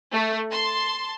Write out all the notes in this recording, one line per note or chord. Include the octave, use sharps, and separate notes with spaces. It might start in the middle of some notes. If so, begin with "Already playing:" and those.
A3
A5 C6